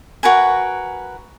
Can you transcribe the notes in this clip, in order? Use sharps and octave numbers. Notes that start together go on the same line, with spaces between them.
F#4 A#4 B4 G#5